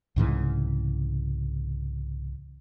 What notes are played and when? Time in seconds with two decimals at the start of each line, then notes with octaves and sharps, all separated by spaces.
0.16 C2 G#2 C#3 E3